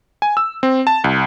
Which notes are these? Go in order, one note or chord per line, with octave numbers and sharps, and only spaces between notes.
G#5
E6
C4
A5
C2